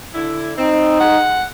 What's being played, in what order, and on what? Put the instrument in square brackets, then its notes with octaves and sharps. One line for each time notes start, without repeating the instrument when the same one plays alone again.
[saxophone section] D3 E4
[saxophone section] C4 [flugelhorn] D#4
[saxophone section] G#3 F#5